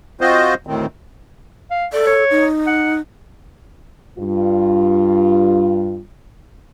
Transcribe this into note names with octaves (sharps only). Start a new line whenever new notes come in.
C4 F4 F#4 C5 D#5
D2 A2 D#3 C4
F5
A4 D5
C#5
D#4
F#5
G2 F4